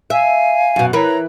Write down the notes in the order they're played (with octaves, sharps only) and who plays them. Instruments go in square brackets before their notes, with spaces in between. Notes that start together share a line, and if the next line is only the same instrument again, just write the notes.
[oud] E5 [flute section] F5 G#5
[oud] F#2 B2
[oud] E3 A#4 B4 [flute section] C#5 A#5